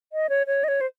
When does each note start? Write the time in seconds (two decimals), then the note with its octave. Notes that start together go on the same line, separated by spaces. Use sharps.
0.13 D#5
0.29 C#5
0.47 C#5
0.64 D#5
0.68 C#5
0.81 C5